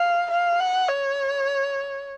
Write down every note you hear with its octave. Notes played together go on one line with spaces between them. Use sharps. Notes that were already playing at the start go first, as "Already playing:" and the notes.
Already playing: F5
F5
F#5
C#5